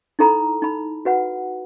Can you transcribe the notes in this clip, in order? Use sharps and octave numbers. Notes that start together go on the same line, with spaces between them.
D#4 E4 A4 A#5 B5
D#4 B5
F#4 B4 F#5